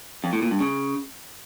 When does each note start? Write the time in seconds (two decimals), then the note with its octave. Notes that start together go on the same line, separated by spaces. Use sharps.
0.24 F2
0.33 A2
0.42 A#2
0.51 G2
0.60 C#3